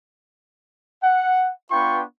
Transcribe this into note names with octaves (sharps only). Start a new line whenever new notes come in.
F#5
B3 D4 F4 B4 G5 C#6